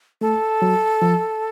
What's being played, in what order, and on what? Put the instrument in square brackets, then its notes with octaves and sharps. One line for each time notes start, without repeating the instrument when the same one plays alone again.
[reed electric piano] A3 [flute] A4
[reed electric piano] F#3
F3